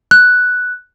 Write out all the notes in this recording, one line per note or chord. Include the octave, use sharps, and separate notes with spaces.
F#6